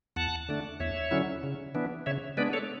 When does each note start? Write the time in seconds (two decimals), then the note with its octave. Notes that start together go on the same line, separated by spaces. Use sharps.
0.16 E2 F#5 A5
0.49 D3 A3 D4
0.80 E2 C#5 E5
1.11 D3 F#3 C#4 E4
1.43 C#3
1.75 E3 B3 D4
2.06 C#3 C#5 E5
2.37 G#3 B3 D4 B4 D5
2.53 A4 C#5